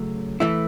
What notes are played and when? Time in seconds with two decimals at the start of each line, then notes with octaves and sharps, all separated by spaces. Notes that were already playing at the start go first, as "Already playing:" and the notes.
Already playing: C#3 F#3 A3
0.40 E3 A3 E4